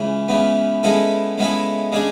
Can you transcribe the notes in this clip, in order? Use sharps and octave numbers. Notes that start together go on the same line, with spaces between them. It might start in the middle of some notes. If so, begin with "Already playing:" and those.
Already playing: C#2 C#3 E3
C#2 C#3 E3 B3
C#3 G#3 B3 E4 A4
C#3 G#3 B3 E4 A4
C#3 G#3 D4 G#4